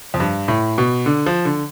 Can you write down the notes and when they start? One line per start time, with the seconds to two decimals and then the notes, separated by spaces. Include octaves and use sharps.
0.14 F2
0.20 G2
0.48 A2
0.78 B2
1.06 D3
1.26 F3
1.45 D3